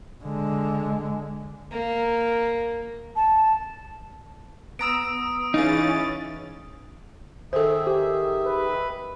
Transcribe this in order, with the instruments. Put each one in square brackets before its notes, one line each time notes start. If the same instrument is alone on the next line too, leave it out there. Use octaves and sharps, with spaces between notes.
[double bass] D3 G#3
[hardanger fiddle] A#3
[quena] A5
[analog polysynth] B3 A#5 E6 [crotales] D#6 D7
[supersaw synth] E3 C#4 A6 [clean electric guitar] D#4 [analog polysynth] G#4 F5
[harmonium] D#3 G#4 E5 [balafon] A4 C5
[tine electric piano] G4
[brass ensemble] B4